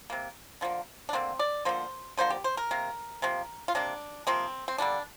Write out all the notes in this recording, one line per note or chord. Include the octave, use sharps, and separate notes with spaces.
C3 A#3
D3 F3 A#3
D4
D3 A#3 C4
D5
D3 F3 A#3 C5
D3 F3 A#3 C5
G4
C5
A#4
C3 A#3
C3 F3 A#3
F4
C3 A#3 D4
C3 F3 A#3 C4
C4
D3 G3 A#3 D4